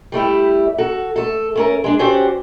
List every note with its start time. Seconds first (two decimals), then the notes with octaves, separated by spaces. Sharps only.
0.12 G3 A3 E4 G4
0.78 F#4 A4
1.16 A3 A4
1.55 A3 C#4 A#4
1.84 G#3 D4
1.99 C4 C#4 F#4 G4 C5 D5